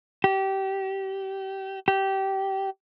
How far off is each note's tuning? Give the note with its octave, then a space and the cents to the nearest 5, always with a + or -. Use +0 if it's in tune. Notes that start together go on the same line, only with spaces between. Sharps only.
G4 -25
G4 -20